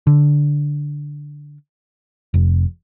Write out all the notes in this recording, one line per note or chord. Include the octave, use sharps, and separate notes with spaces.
D3
F1